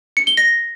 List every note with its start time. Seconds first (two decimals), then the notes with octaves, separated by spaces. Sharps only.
0.17 C#7
0.27 G7
0.37 A#6